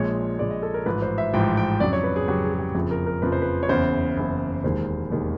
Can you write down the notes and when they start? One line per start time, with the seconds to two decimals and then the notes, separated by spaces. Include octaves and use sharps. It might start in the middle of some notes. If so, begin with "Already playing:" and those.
Already playing: A#1 A#2 F3 G#3 C#5
0.39 A#1 A#2 F3 G#3 D5
0.50 D#5
0.63 A4
0.74 A#4
0.86 A1 G#2 F3 B4
1.02 C5
1.18 E5
1.33 A1 G#2 F3 G5
1.57 G5
1.80 F2 C#3 F#3 D5
1.93 C#5
2.04 B4
2.16 G#4
2.28 F2 C#3 F#3 G4
2.44 G#4
2.54 G#4
2.59 G4
2.75 F#1 F2 C#3 F3 G#4
2.91 A#4
3.06 A#4
3.22 F#1 F2 C#3 F3 B4
3.32 C5
3.42 B4
3.63 C#5
3.69 F#1 E2 C#3 C5
4.17 F#1 E2 C#3
4.63 E1 D#2 D#3 G#3 C5
5.10 E1 D#2 D#3 G#3